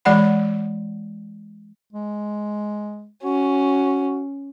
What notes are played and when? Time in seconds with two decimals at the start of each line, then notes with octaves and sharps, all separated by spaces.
0.05 E3 G#3 D5 F#5 B5
1.93 G#3
3.23 C#4 F#4